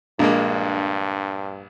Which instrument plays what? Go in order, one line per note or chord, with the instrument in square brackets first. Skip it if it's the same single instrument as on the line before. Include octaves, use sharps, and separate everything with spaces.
[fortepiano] A#1 G#3 A#3 [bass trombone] G2 [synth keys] D4